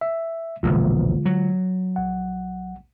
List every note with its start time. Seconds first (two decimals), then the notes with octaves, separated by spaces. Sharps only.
0.01 E5
0.63 E1 A#1 E2 D3 G#3 F4
1.26 F#3
1.96 A#1 F#5